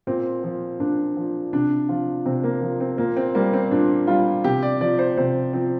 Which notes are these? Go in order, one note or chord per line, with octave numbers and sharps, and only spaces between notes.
A#2 C4
F3
A#2 D4
F3
C3 D4
F3 F4
C3 C4
A#3
F3
C4
A#2 A#3
C4
G3 A#3
C4
A#2 D4
G3 F4
C3 G4
D5
F3 D5
C5
C3 C5
F3 C4